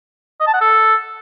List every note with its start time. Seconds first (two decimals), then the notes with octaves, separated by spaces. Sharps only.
0.40 D#5
0.47 A5
0.54 F#5
0.61 A4